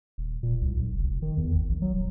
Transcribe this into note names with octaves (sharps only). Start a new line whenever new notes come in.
D#1
A#2
C2
B1
F1
F1
D#3
E2
G#1
A#1
F#3
D#1